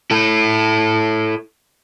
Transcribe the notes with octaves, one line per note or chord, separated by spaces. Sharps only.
E4 A4